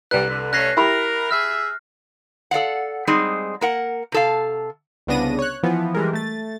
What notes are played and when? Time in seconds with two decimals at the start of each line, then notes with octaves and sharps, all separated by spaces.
0.11 C2 D3 G3 B4 F#6
0.29 D3
0.53 A3 C#4 F#6 A#6 C7
0.77 E4 G4 A#4 B5
1.31 G#4 E5 F6
2.51 A4 D5 F5 F#5
3.07 G3 G#3 C4 D#4 G#4
3.61 A#3 A#4 F#5
4.12 C3 A4 F5
5.07 C2 C#3 B3 D4 A#6 D#7
5.39 C#5 F#6
5.63 E3 F3 B3
5.95 E3 G3 G#3 A#4
6.13 A3 A6